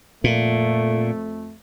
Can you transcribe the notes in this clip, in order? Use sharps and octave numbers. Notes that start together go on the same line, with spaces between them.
F2 A#2 A3